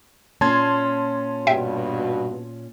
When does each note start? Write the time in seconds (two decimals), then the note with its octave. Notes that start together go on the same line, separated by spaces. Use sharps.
0.41 A#2 C#4 A5 C6 G#6
1.47 G2 B2 E5 G5